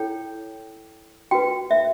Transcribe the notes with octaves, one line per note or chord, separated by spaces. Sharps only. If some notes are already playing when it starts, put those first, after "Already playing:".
Already playing: E4 A4 C#5 G5
F#4 B4 G5
E5